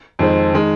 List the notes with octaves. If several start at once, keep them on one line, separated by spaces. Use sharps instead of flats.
F2 D#3 G#3 C4
D#3 G#3